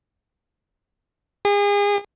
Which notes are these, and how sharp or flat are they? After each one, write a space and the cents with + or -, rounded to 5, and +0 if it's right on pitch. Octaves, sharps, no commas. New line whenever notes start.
G#4 -35